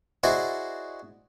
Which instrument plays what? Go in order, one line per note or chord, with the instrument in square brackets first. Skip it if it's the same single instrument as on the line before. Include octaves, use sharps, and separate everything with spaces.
[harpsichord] E4 F#4 G#4 C5 D5 D#5